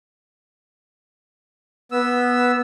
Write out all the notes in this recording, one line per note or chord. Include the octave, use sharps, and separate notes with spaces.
B3 E6